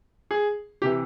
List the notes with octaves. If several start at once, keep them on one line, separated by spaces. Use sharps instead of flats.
G#4
C3 E3 G4